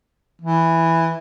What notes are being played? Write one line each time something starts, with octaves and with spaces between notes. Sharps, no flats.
E3